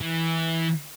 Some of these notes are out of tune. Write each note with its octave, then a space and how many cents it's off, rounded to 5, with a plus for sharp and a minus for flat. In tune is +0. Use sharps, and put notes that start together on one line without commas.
E3 -10